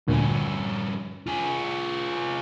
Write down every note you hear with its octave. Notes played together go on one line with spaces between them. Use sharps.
D2 G2 A#2 C#4
F4 G#4